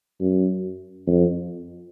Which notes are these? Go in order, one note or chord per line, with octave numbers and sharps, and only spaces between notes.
F#2
F2